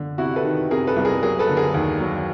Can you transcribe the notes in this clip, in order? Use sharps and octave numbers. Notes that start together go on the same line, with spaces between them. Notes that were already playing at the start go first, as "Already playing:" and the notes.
Already playing: D3
C3 E4 F#4
A4 B4
D#3
C3 G#4 A#4
A4 B4
C2
G#4 A#4
F#3 G#4 A#4
A4 B4
D3
G#4 A#4
D#2
F#3